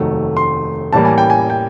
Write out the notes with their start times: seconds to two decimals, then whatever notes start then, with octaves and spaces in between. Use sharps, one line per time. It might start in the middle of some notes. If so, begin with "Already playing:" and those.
Already playing: F1 D#2 D#3 F#3 A3
0.37 C6
0.93 A2 E3 G3 A#3 A5
1.05 G#5
1.18 G5
1.30 G#5
1.50 G5